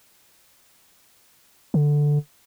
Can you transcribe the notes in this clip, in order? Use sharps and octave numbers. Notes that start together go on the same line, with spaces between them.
D3